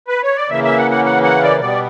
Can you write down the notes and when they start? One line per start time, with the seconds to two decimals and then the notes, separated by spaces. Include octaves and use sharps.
0.08 B4
0.23 C#5
0.36 D5
0.49 C#3 E3 A#3 E5
0.64 E5
0.78 F#5
0.91 F#5
1.05 F#5
1.23 F#5
1.43 D5
1.60 B2 G3 B3 D5